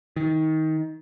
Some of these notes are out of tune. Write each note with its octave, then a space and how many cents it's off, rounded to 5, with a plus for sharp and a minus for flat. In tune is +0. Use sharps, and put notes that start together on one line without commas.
D#3 +20